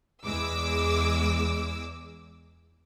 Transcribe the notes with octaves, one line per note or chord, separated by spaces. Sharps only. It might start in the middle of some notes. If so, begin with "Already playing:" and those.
E2 G#3 D6 E6